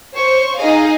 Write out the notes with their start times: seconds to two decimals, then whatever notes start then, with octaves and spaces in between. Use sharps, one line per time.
0.14 C5 C#5 C#6
0.57 D#4 G#4 D#5 F5